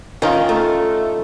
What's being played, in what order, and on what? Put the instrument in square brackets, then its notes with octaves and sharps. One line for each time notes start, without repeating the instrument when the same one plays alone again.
[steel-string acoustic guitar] D#3 [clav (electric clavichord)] C#4 D#4 F4
[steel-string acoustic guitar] A3